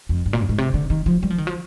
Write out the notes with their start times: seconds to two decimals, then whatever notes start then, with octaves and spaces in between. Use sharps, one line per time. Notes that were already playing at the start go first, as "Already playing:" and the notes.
0.09 F2
0.26 G2
0.33 A#2
0.41 G2
0.49 G#2
0.58 C3
0.74 D3
0.90 D#3
1.06 F3
1.23 G3
1.30 F3
1.38 D#3
1.47 F3